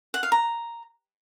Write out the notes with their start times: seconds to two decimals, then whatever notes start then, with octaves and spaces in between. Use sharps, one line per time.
0.14 F#5
0.23 F5
0.32 A#5